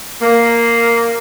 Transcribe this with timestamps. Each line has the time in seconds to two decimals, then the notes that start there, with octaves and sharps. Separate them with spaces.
0.21 A#3